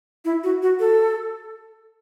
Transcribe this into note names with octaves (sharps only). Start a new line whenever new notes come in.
E4
F#4
F#4
A4